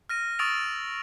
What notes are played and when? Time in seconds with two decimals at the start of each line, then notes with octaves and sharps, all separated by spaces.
0.09 F6 A#6 D#7
0.39 C#6 D#6 E6 A6 D7 F7